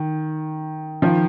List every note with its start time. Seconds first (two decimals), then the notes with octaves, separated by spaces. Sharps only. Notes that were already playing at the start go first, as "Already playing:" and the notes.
Already playing: D#3
1.02 D#3 F3